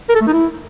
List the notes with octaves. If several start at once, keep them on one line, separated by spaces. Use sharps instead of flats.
A#4
A4
A3
D#4
E4